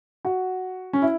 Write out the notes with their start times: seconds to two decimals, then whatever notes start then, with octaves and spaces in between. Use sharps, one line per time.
0.25 F#4
0.93 C#4
1.02 E4